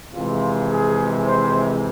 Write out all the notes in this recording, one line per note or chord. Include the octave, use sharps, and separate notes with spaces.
F2 C3 E3 G#3 F4
G#4
C5